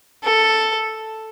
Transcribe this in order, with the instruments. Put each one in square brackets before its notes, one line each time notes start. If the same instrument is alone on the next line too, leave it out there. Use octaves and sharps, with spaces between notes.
[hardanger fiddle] A4